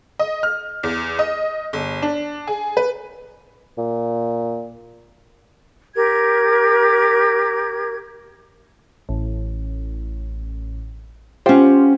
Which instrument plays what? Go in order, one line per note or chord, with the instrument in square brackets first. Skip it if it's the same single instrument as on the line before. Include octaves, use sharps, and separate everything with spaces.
[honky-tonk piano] D#5
F6
E2
D#5
G1
D4
G#4
B4
[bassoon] A#2
[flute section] G4 A#4 G#6
[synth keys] A1
[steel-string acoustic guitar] C#4 F#5 [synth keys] F4 G4 C5